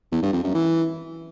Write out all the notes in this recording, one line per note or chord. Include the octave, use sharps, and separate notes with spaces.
E2
G2
F2
F#2
E3